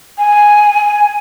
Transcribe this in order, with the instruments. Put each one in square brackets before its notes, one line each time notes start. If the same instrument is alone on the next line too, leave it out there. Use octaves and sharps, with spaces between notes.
[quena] G#5